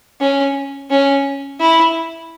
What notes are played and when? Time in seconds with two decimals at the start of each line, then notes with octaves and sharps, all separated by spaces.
0.20 C#4
0.90 C#4
1.60 E4